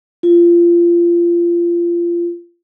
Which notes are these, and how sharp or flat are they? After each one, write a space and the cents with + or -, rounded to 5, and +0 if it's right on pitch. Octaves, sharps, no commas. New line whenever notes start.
F4 -25